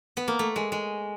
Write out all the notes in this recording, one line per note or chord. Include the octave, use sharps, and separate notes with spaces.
B3
A#3
A3
G#3
G#3